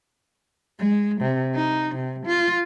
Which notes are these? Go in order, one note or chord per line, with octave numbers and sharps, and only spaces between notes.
G#3
C3
D#4
C3
F4